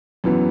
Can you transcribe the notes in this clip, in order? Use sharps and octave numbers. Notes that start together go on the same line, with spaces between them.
F#2 E3 B3